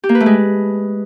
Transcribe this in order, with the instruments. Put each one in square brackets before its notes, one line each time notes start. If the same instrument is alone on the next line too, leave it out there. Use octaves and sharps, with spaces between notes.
[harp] G4
A#3
B4
A3
G#3